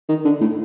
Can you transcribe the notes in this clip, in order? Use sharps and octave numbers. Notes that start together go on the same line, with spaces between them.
D#3
D3
A2